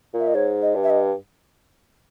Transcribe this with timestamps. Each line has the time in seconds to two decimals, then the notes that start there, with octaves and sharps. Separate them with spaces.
0.14 A#2
0.19 E5
0.27 D#5
0.35 G#2 C#5
0.62 D#5
0.75 G2
0.83 E5
0.90 D#5